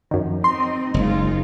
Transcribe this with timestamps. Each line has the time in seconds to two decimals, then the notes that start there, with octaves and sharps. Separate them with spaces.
0.11 F#2 D#3 F3
0.44 C4 D#4 D#5 C6
0.94 F#1 G#3 D#4 F4